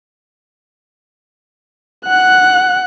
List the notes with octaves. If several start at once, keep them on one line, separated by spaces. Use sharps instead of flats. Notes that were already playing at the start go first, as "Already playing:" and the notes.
F#5 F#6